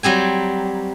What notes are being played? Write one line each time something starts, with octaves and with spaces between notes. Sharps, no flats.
F#3 G3 C4 G#5